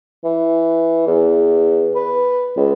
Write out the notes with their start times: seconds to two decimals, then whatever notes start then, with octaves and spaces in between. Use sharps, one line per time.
0.24 E3
1.07 E2
1.95 B4
2.56 C#2